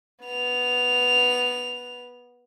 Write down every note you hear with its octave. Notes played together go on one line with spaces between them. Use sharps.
B3 F7